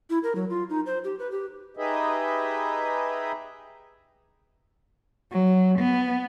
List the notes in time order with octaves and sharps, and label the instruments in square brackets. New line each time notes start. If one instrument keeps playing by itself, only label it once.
[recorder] E4
A#4
F#3
F4
D#4
C5
G4
B4
G4
[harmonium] D#4 G4 G#4 B4 D#5 E5
[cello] F#3
B3